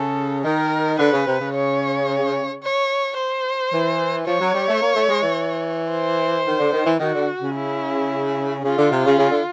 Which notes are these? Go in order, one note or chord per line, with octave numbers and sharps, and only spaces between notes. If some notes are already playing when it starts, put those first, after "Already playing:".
Already playing: C#3 A4
D#3 A#4
D3 B4
C#3
C3
C#3
C#5
C#5
C5
E3
F3 C#5
F#3
G3
A3
A#3
A3
G#3
E3
C5
D#3
D3
D#3
E3
D#3 F#4
D3
C#3
E4
C#3 F4
D3
C3
C#3
C#3
D3